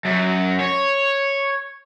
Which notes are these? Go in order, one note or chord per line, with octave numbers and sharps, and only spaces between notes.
F#2
C#5